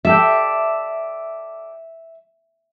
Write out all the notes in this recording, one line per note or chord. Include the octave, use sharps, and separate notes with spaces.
G4 A4 D5 E5